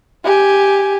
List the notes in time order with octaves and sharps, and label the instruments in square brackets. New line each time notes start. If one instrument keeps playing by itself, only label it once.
[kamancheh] G4 G#5